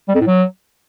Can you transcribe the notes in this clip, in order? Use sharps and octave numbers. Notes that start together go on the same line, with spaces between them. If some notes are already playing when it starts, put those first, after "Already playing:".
G3
F2
A2
F#3